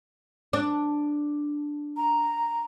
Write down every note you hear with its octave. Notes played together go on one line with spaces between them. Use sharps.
D4
A#5